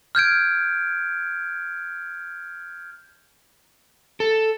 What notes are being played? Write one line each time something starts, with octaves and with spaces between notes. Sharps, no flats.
F6 G6 G#6 D7
A4